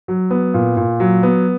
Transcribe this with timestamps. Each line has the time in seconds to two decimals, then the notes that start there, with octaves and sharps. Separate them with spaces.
0.08 F#3
0.30 B3
0.54 A#2
0.77 A#2
1.00 F#3
1.23 B3